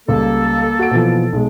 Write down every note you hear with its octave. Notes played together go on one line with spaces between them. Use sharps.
C#2 G3 A#3 A4
F#4 D7
B2 E3 F3
B1 G#3